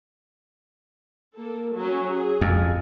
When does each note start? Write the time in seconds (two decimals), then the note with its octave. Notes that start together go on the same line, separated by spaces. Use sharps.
1.35 A#3 A4
1.75 F#3 C#4
2.11 G#4
2.41 F2